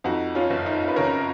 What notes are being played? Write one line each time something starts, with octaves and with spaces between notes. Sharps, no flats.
F2 D#4 F#4
C#4 F4
F#1
D#4
B4
C#3 A#4 C#5